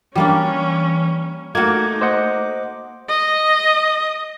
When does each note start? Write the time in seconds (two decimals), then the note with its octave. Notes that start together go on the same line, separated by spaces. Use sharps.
0.15 E3 G3 A#3 C#4 D4
1.55 A3 A#3 D#4 F#4 D6 G#6
2.01 C5 D#5 F#5
3.09 D#5